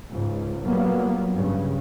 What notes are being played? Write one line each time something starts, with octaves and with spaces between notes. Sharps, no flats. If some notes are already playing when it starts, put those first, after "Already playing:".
C#2 G#2
A#2 F#3 G3 A#3 B3
G2 C#3